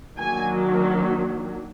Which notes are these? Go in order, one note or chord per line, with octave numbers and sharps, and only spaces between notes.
D#3 F#3 A#3 D4 G#5